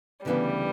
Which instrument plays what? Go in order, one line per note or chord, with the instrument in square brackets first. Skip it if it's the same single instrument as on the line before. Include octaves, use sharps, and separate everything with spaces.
[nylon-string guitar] D2 C#3 E3 B3 D4 [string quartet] G3